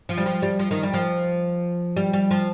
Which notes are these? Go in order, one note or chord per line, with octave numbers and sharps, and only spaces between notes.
F3
G3
F3
G3
F3
D#3
G3
F3
G3
G3
F3